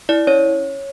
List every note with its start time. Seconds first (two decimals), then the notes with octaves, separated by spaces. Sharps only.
0.09 E4 D5
0.27 C#4 C#5